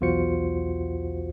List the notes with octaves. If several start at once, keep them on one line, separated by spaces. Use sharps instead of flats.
B1 E2 F4 F#4 C5 C#7